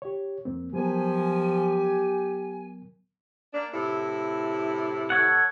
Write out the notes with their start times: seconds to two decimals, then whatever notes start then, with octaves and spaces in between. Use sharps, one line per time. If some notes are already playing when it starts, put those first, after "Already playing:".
0.02 G4 C#5
0.45 F2 A#3 C4
0.73 F3 F#3 B3 G4 A#4 G#5
3.54 A#3 D4
3.72 A2 C3 E4
5.10 A4 C#5 F#5